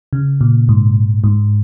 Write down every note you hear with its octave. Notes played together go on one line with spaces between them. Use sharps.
C#3
A#2
G#2
G#2